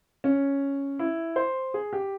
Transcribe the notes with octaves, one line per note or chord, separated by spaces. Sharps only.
C#4
E4
C5
G#4
G4